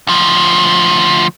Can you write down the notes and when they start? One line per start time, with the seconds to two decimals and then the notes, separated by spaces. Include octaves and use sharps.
0.07 D2 F3